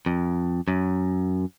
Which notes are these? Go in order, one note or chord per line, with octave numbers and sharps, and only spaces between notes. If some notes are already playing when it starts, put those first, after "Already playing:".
F2
F#2